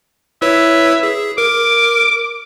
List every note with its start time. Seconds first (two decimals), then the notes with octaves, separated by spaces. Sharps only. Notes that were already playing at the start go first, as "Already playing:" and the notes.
0.42 E4 B4 C#5 E5
1.03 G#4
1.38 A#4 D6